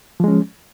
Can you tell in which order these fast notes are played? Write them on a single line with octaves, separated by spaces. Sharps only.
F3 G#3 C#4